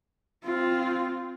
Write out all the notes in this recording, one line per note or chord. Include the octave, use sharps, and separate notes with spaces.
C4 F4